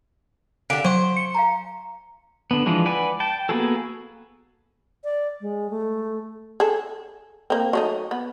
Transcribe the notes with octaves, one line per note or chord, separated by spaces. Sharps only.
D3 G4 F5 G#5 D6 D7
F#3 C5 C#6
C#7
F5 G#5 A#5
D3 B3
E3 F3 G#3 D4
B4 D5 F#5 G#5
G5 A5
A#3 B3 F#4 G#4 A4
D5
G#3
A3
G#4 A4
A#3 C4
F#3 A3 D#4
B3